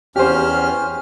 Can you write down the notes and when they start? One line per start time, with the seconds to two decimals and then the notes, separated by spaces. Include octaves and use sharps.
0.16 E2 C#4 G4 C5 F6